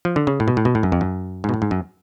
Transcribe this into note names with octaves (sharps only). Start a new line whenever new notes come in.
F3
D3
C#3
A2
B2
A2
B2
A2
F#2
F2
F#2
G#2
B2
A2
G#2
F#2